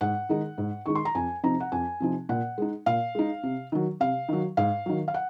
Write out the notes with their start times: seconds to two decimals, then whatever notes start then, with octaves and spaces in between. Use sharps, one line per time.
0.01 G#2 F#5
0.29 D#3 G#3 D#4
0.58 G#2
0.86 D#3 G#3 D#4 C#6
0.95 C6
1.05 A#5
1.15 F2 G#5
1.43 C3 F3 C4 D#4 A#5
1.60 F#5
1.72 F2 G#5
2.00 C3 F3 C4 D#4
2.29 A#2 F#5
2.58 G#3 D#4
2.86 A#2 F5
3.15 G#3 D#4
3.43 C3
3.72 D#3 F#3
4.00 C3 F5
4.29 D#3 F#3
4.57 G#2 F5
4.86 D#3 F#3
5.08 F5
5.14 F#5